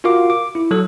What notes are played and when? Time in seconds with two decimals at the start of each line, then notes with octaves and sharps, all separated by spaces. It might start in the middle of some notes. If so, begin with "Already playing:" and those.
0.04 F4 F#4 A#4 F5 D6
0.30 D6
0.55 E4
0.71 F#3 A4